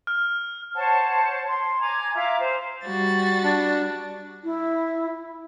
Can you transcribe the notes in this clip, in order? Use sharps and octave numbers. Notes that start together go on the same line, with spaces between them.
F6
C5 C#5 F#5 A5
C6
G#5 A#5 D6 G#6
F4 E5 A#5 D6
C5
G3 F#4 A6
D4
E4